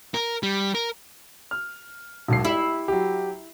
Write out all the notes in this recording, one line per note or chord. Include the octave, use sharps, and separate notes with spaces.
A#4
G3
A#4
F6
E1 B1 C7
E4 G4
F#3 G4